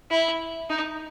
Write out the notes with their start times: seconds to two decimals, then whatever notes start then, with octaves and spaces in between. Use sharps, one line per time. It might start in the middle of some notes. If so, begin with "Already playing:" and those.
0.11 E4
0.70 D#4